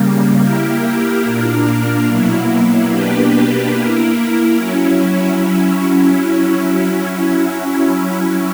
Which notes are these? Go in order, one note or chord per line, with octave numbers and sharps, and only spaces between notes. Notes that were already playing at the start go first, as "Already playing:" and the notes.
Already playing: C#3 G3 A#3
A#3 E4 G4 A#4
A#2 A#3 D4 A#4
B2 F#3 A#3 E4
B2 A#3 D4 G4 B4
A#3 E4 A#4
F#3 C#4 E4